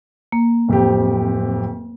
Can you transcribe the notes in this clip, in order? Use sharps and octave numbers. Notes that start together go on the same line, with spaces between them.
A#3
D1 F2 G4